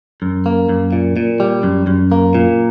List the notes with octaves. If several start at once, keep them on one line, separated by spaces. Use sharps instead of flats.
F#2
A#3
F#2
A#2
A#2
G3
F#2
F#2
A#3
A#2